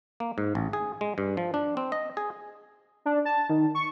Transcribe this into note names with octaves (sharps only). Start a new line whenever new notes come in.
A#3
G#2
A1
G#4
G#3
G2
F3
D4
C4
D#5
G#4
D4
A5
D#3
C#6